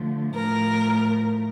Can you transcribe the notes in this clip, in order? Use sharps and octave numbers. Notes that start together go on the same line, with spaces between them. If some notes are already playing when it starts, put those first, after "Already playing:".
Already playing: D3 F3 A3
A2 F3 A3 A#4